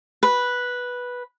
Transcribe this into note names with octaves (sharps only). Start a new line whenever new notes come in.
B4